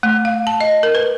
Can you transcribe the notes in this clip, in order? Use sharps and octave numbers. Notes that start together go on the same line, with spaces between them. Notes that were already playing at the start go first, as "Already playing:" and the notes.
A3
F5
A5
D#5
A#4
B4